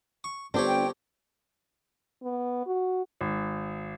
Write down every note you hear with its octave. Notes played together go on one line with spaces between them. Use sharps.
C#6
G1 C4 D4 G4 C#5
G5
B3
F#4
G#1